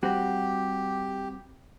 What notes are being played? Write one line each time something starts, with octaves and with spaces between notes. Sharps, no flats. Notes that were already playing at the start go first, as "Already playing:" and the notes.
G3 C4 F#4 G4